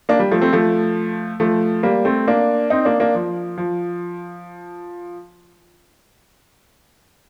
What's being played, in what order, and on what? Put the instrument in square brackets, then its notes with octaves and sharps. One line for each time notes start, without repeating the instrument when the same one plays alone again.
[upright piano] A#3 D4
G3
F3 A3
A3 C4
F3 A3
F3 A3
G3 A#3
A3 C4
A#3 D4
C4 D#4
A#3 D4
A#3 D4
F3
F3